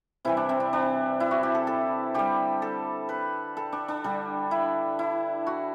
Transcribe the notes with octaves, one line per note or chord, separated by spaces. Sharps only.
C3 E3 G3 E4
D4
C4
D4
D4
E4
F#4
G4
A4
A4
D3 G3 G4
A4
B4
A4
D4
D4
D3 G3
E4
E4
F#4